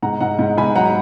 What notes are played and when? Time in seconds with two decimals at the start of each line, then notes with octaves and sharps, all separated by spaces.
0.02 G#2 F#5 A#5
0.21 G#2 F#5 A#5
0.39 G#2
0.58 G#2 G#5 B5
0.75 F#3 F#5 A#5